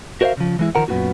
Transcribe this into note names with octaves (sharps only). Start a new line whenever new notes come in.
F#4 A#4 C5 D5 E5 F5
C#3 F3
E3 G#3 E4
D#3 F3 A#4 F#5
F#2 A#2 B3 D4 D#4 F#4